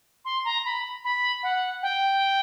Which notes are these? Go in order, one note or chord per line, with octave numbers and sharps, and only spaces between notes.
C6
A#5
B5
B5
F#5
G5